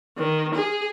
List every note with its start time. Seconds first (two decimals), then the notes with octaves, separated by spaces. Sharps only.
0.18 D#3
0.55 G#4